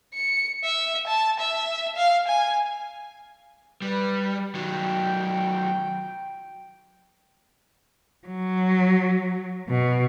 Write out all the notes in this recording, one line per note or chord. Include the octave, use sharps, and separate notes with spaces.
C#7
E5
A5
E5
F5
G#5
G3 B4
D#3 F#3 G5
F#3
B2